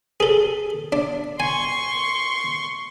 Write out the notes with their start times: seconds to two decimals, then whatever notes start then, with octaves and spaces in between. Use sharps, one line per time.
0.20 G#4 A4
0.92 D4
1.40 G#5 C6 C#6